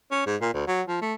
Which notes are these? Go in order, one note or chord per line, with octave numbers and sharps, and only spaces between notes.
C#4
G#2
A#2
D2
F#3
F3
A3